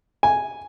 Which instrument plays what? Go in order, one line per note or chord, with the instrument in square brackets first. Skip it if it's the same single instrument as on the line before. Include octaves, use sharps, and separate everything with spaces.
[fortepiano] G#5